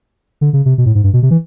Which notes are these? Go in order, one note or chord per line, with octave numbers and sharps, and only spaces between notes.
D3
C#3
C3
B2
A2
G#2
G2
B2
C3
E3